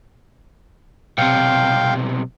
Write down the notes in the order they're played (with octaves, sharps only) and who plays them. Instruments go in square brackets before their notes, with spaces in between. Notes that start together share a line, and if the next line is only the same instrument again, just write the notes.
[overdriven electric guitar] B1 C3 [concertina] F5 G5